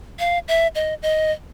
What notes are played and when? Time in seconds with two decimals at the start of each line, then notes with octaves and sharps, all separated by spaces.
0.19 F5
0.48 E5
0.75 D#5
1.02 D#5